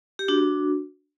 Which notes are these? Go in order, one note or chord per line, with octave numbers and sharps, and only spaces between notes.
G4
D4 F#4